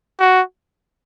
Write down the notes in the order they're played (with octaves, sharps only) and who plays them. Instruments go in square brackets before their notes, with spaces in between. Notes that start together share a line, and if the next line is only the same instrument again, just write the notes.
[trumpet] F#4